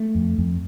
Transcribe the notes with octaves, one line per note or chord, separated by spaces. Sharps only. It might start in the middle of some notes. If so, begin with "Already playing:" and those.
Already playing: A3
F2
F2